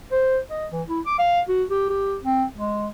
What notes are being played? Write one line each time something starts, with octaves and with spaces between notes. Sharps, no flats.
C5
D#5
E3
E4
D6
F5
F#4
G4
G4
C4
G#3